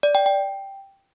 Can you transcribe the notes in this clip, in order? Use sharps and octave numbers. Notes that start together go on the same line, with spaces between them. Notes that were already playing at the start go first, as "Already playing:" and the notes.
D5
G5
G5